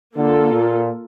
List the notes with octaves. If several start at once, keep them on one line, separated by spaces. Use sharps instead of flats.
D3 A#3 F4 A4
A#2